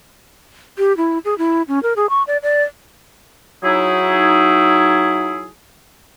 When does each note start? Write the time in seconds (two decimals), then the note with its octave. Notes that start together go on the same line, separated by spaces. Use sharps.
0.78 G4
0.97 E4
1.25 G#4
1.38 E4
1.68 C#4
1.83 A#4
1.96 G#4
2.10 C#6
2.27 D5
2.43 D5
3.63 F#3 D#4 E4 G#4